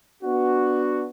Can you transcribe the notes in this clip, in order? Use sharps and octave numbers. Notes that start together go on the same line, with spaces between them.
B3 D4 F#4